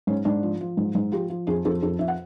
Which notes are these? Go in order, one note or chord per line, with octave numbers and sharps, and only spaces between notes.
G#2 C#4
G#2 D4
F3
F3
G#2
G#2
F3 G4
F3
F2 G#4
F2 A4
F2 A4
F2 E5
F#5